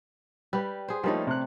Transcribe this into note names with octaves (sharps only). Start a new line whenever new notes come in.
G3 G4 B4
G#4 C5
F3 G3 A3 A#3 D#4 C#5
C3 F#6